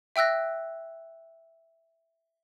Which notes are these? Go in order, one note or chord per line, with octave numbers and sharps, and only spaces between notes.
E5 G5 E6 F#6 A#6